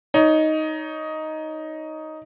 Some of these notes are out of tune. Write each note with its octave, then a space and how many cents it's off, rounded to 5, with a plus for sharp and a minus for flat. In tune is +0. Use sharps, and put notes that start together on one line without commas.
D#4 +5 C#5 +25